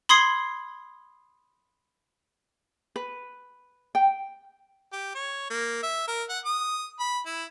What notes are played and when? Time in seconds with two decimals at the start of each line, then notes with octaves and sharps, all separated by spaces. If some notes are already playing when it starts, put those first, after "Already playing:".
0.09 B5 C6 D#6 G#6 C7 G7
2.96 B4
3.95 G5
4.93 G4
5.15 C#5
5.50 A#3
5.83 E5
6.08 A#4
6.29 F#5
6.45 D#6
7.00 B5
7.26 E4